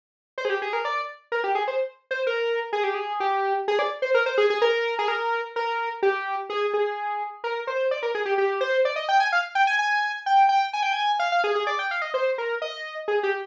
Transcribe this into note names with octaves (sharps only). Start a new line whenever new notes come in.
C5
G#4
G4
G#4
A#4
D5
A#4
G4
G#4
C5
C5
A#4
G#4
G4
G#4
G4
G#4
D5
C5
A#4
C5
G#4
G#4
A#4
G#4
A#4
A#4
G4
G#4
G#4
A#4
C5
D5
A#4
G#4
G4
G4
C5
D5
D#5
G5
G#5
F5
G5
G#5
G#5
G5
G5
G#5
G5
G#5
F5
F5
G#4
G#4
D5
G5
F5
D#5
C5
A#4
D#5
G#4
G4